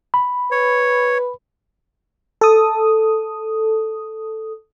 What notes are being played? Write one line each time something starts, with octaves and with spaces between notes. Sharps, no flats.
B5
B4 C#5
A4 D#6